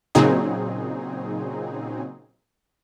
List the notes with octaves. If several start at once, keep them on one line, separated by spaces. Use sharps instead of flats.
A#2 C#3 F#3 C4 D#4 G#4